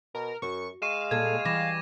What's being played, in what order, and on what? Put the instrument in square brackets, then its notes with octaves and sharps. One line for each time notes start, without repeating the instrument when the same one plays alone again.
[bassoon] B2 [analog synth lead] A#4
[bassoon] F#2 [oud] F#4 [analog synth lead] C#6
[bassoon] G#3 [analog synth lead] F5 [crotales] C#6 D#7 E7
[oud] A#2 G3 A4 [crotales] G#6
[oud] E3 G3 [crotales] D6 A#6 E7